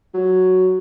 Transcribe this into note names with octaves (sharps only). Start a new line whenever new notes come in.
F#3